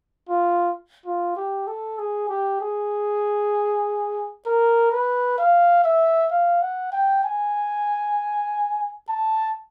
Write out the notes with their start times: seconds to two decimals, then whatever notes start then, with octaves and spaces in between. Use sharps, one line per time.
0.29 F4
1.06 F4
1.36 G4
1.67 A4
1.98 G#4
2.29 G4
2.60 G#4
4.46 A#4
4.92 B4
5.38 F5
5.84 E5
6.31 F5
6.62 F#5
6.92 G5
7.24 G#5
9.09 A5